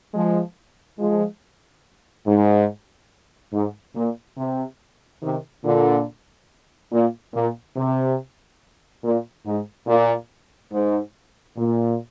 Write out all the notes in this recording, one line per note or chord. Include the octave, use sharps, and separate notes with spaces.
F3 G#3
F3 G#3
G#2
G#2
A#2
C3
C3 D#3
A#2 D3
A#2
A#2
C3
A#2
G#2
A#2
G#2
A#2